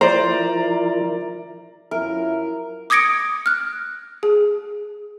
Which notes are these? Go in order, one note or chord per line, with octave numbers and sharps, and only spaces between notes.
F3 E4 A#4 C5 D5 A#5
F#2 F3 E4 A#4 E5
D6 D#6 G#6 A#6 C#7 D7
F6 F#6
G#4